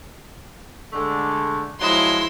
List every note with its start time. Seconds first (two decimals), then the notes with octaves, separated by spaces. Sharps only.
0.92 D3 G#3 A3
1.80 F3 F#3 G#3 E4 C6